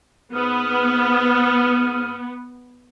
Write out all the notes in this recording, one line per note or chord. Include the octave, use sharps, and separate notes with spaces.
G#2 B3 D#6 F6